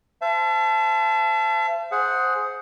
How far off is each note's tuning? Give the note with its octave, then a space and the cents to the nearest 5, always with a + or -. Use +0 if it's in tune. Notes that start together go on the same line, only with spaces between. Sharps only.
C5 -20 E5 +45 A5 -10
G#4 +10 C5 +0 F#5 +0